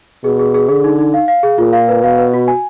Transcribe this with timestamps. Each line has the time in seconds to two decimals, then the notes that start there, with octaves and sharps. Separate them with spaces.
0.24 B2 G#4
0.39 G#4
0.54 G#4
0.68 D3 G#4
0.84 D#4
0.99 D#4
1.14 F5
1.28 F5
1.43 G#4
1.58 A#2 F4
1.73 F5
1.88 B4
2.03 B2 F5
2.18 B4
2.34 F#4
2.48 G#5